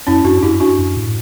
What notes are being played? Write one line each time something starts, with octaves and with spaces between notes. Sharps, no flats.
F#2 C#4 E4
F#2 D4 F#4
F#2 E4 G4
D4 F#4
F#2
A2